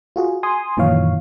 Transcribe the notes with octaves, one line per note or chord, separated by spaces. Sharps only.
F4 F#4 G#4
G#5 C6 D#6
F#2 A#2 D#3 E3 C#5 F5